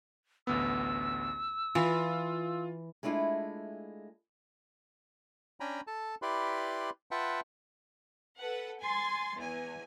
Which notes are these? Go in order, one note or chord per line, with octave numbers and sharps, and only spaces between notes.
A1 D2 B3 E6
E3 F4
G#3 A3 D4 E4 F4
C#4 D4 G5 G#5 A#5 B5
A4 A5
E4 G4 B4 D5 B5 C6
F4 B4 E5 F#5 G5 A5
A4 B4 F#5
G#5 C6 A6
E2 G#5